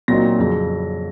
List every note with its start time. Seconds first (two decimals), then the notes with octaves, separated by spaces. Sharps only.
0.08 A#2 F#3 C4 D#4 A#6
0.39 F2 C#3 F#3